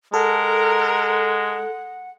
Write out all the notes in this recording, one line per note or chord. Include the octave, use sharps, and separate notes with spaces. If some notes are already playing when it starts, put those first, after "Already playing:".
G#3 A4 A#4 F#5